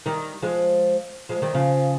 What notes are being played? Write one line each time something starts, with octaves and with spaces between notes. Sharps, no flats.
D#3 G3
F3 G#3
F3 G#3
D#3 G3
C#3 F3